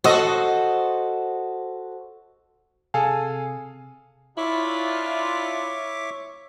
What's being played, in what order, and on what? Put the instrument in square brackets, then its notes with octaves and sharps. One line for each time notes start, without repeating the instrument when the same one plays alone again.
[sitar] F#4 A4 D#5 [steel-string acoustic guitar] C5
[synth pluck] C3 [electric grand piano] G#4 A4 F5 [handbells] G#5
[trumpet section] D4 F4 [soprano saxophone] E4 [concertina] C#5 E5 D6